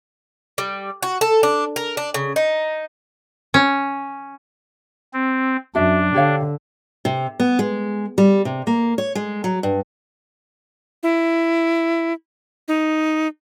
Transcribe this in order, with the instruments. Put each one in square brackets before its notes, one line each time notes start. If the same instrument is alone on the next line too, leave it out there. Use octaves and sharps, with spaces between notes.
[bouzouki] G3
F#4
A4
D4
A#4
D4
C#3
D#4
[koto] C#4
[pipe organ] C4
[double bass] F#2 [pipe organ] D4 [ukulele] F#4 E5
[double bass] D3 [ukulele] G4 C#5 F5
[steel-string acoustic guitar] C3
B3
G#3
G3
C3
A#3
C#5
G#3
F#3
G2
[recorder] E4
D#4